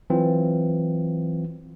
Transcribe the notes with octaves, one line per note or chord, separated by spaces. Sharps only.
E3 F#3 C4 F4